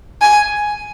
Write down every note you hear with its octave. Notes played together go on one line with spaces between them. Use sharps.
G#5